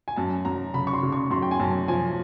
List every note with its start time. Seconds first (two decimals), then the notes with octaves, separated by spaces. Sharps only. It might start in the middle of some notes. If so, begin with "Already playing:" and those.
0.08 G#5
0.16 F#2 A5
0.45 F#2 A#5
0.74 C#3 B5
0.87 C#6
0.93 C6
1.03 C#3
1.12 C#6
1.31 F#2 C6
1.42 G5
1.51 G#5
1.60 F#2 A5
1.88 F3 G#5